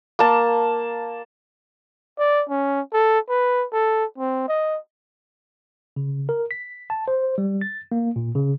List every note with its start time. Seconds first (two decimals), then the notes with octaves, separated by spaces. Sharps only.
0.19 A#3 A5
2.19 D5
2.49 C#4
2.93 A4
3.29 B4
3.73 A4
4.18 C4
4.48 D#5
5.96 C#3
6.29 A#4
6.51 B6
6.90 A5
7.08 C5
7.38 G3
7.61 A6
7.92 A#3
8.16 A#2
8.35 C#3